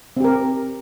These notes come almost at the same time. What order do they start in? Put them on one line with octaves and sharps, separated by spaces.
C4 G4 A#4